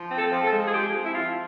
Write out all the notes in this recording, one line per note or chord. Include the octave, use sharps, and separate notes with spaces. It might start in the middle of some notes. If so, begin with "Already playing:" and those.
Already playing: F3
C4
A4
F3
A4
G#3
G#4
F3 G4
C4
E4
F3 F4